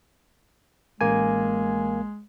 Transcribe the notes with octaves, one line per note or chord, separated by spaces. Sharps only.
A1 G#3 A#3 G#5